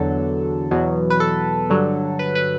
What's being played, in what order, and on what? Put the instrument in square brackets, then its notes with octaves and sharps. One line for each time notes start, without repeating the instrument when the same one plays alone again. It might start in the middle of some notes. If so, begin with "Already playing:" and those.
Already playing: [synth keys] E2 D3 F#3 A4
E2 B2 F#3
B4
A4
G2 D3 F#3
B4
B4